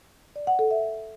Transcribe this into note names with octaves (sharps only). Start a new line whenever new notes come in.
D5
F#5
A4
E5